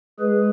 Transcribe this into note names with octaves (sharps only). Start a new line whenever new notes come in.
G#3 G#4 B4